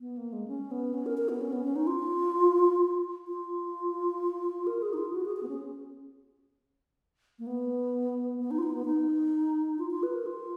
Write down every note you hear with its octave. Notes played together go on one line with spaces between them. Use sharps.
B3
A#3
G#3
C#4
B3
C#4
A#4
A#4
B3
C#4
B3
C#4
D#4
F4
F4
A#4
G#4
D#4
F4
F#4
G#4
G#4
B3
C#4
A#3
B3
B3
D#4
F4
D#4
B3
D#4
F4
F4
B4
A#4
F4